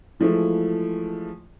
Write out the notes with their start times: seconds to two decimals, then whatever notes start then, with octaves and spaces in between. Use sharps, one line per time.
0.20 E3 F3 G#3 A3 E4